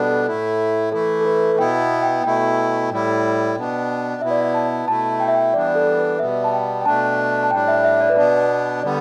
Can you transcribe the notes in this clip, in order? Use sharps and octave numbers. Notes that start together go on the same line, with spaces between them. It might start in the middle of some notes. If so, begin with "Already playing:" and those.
Already playing: B2 G3 B3 D4 A4
A2 A3 E4
E3 A3 E4 A4
A4
B4
B2 B3 E4 G5
G5
B2 A3 E4 G5
A2 G3 E4
B2 B3 D4
B2 B3 E4 E5
D5
E5
A5
B2 A3 E4 A5
G5
E5
G5
E3 G3 B3 D4 D5
A4
B4
B2 G3 B3 E5
A5
G5
G5
B2 A3 D4 A5
A5
A2 G3 D4 G5
E5
E5
D5
B4
B2 B3 D4 D5
D3 G3 B3 D5